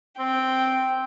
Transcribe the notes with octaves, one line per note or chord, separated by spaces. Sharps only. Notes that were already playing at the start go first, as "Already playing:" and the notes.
C4 G5